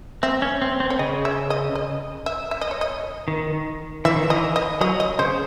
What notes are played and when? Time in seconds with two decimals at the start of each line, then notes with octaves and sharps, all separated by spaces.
0.23 C4 E5
0.42 C#4
0.62 C4
0.80 C4
0.90 C#5
0.99 C#3 D#5
1.25 E5
1.50 D#5
1.75 D#5
2.26 E5
2.51 E5
2.61 D#5
2.71 C#5
2.81 D#5
3.28 D#3
4.05 E3 E5
4.16 D#3
4.29 E3 D#5
4.56 D#5
4.81 F#3 D#5
5.00 D#5
5.19 C#3 C5